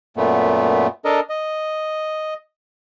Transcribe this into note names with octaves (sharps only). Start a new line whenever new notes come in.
F#2 A#2 A3 B3
D4 A4 A#4 D#5
D#5